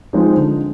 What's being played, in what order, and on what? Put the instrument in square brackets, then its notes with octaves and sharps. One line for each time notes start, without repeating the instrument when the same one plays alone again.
[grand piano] F3 G#3 C4 D#4
D3